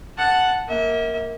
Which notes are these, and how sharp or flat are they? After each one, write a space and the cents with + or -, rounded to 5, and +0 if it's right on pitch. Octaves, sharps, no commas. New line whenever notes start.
F#5 +0 A5 +0
A#3 +0 E5 -40